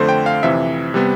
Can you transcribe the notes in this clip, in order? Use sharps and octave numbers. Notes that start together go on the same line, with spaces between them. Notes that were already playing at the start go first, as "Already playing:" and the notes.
Already playing: F2 D3 A3 C5
G5
F5
F2 C3 E3 E5
C3 G3 B3